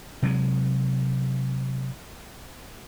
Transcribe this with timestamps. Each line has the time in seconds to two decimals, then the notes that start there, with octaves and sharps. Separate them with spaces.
0.22 C3 F#3 G#3